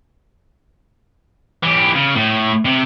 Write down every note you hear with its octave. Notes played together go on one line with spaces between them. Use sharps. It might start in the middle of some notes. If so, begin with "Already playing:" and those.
E3 G4
C#3
A2
C3